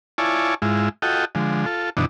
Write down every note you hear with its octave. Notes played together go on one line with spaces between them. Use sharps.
E4 F4 C#5 D5 G#5 A5
G#2 G#3 E4 F4
F4 F#4 A4 D#5 G5
D3 F3 G#3
F4 A4
F#2 B2 D3 E3 D4 D#4